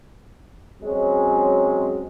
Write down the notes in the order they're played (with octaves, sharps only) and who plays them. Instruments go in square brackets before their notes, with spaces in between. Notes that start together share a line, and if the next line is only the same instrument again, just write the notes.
[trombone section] F#3 G#3 C4 C#4